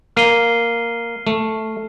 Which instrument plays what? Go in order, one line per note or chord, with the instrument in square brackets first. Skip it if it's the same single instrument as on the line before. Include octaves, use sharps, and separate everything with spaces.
[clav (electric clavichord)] A#3 [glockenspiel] F6 C7 D#7 G7
[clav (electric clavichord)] A3